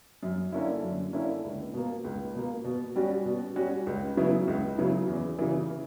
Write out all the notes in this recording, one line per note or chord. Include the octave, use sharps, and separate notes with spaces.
F#2
D3 A#3 C#4 E4
F#2
D3 A#3 C#4 E4
C#2
B2 A#3
C#2
B2 A#3
B2
G3 C#4 F#4
B2
G3 C#4 F#4
C#2
C#3 F#3 B3 E4
C#2
C#3 F#3 B3 E4
E2
C#3 E3